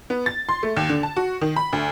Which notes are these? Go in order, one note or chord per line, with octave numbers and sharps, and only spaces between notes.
B3
A6
C6
A3
D#2
D3
A5
F#4
D#3
B5
D2